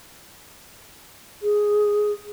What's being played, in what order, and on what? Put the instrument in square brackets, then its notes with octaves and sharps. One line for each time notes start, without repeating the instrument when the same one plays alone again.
[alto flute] G#4